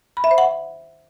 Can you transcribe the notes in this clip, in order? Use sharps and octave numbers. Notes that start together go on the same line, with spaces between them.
B5
E5
C5
F#5